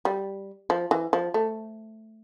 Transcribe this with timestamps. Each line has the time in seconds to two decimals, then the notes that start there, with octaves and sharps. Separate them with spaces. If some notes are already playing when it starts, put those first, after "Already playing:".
0.05 G3
0.70 F3
0.91 E3
1.13 F3
1.34 A3